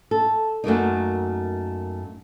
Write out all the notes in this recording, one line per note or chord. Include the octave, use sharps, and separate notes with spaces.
A4
F#2 A3 A#3 D#4